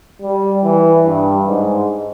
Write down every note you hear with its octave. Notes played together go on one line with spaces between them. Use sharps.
G3
E3
G2
G#2